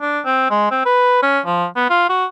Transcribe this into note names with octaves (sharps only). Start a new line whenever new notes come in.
D4
C4
G#3
C4
B4
C#4
F3
B3
F4
F#4